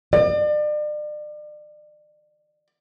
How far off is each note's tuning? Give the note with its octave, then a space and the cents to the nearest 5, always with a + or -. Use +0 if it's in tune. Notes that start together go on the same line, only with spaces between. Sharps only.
D5 +35